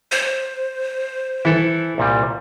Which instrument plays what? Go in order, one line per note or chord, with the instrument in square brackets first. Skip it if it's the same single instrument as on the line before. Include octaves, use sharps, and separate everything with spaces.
[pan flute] C5
[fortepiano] E3 [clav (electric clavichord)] E4 A4
[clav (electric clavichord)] C2 A#2 G3